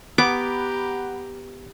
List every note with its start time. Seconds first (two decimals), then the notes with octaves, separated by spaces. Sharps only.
0.18 B3 G4 F#5 A#5 B5 D6